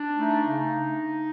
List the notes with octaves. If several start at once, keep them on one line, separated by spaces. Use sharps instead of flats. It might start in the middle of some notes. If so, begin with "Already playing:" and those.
Already playing: D4
A3 D#4
C#3